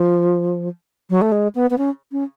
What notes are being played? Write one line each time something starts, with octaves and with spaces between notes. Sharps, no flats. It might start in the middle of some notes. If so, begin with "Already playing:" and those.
Already playing: F3
F#3
A3
G#3
B3
B3
C#4
C#4